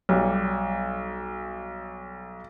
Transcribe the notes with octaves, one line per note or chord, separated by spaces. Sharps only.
B1 G3